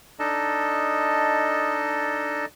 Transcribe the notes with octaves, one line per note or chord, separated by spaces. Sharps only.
D4 D#4 A4 D#5 A5